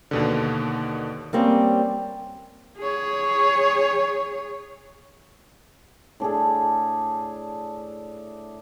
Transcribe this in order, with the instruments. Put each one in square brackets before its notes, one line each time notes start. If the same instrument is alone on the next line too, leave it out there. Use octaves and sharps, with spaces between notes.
[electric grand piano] D#2 B2 D3
[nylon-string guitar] G3 A#3 C4 C#4
[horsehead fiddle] G#4 C#5
[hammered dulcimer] A2 D4 G#4 A4